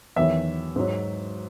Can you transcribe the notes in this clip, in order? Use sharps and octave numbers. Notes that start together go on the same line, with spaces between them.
E2 D#3 F#3 E5
G#2 F#3